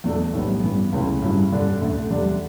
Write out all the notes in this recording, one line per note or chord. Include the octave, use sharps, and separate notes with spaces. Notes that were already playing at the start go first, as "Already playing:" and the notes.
E2 B2 A3 D4 A4
B1 A2 G3 B3
G2 E3 B3
C#2 C#3 F#3 A3 E4
G2 F#3 C#4 E4
G2 D3 G3 D4
D2 D3 A3
E2 D3 G3 D4